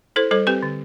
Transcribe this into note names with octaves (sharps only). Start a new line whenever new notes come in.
E4 A4 C5
G3 A4 C5
C4 G4 B4
D3